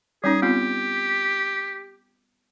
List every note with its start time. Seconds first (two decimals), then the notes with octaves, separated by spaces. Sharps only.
0.24 G3 C#4 D#4 G#4
0.42 B3 C4 F4 G4